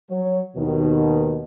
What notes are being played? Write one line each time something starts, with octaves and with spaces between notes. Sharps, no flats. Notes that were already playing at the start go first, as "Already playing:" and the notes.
F#3 C#5
D#2 B2 D#3